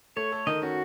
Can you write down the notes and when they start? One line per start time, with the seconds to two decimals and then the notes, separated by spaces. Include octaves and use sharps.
0.16 A3 C#5
0.32 A4
0.47 D#3 D#5
0.62 C#4 F#4